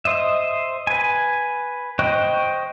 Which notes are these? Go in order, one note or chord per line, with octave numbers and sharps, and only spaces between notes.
C5 D#5 E5
B4 G#5
C5 D#5 G5 C#6 F#6